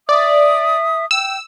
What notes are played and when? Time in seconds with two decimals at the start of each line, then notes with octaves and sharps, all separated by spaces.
0.09 D5 E5 D#6
1.11 G5 E6